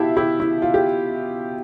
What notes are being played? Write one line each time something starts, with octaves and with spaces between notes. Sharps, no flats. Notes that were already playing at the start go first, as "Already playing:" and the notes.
Already playing: B2 E4 G4 E5 F5 A5
E4 G4
E4
F4
G4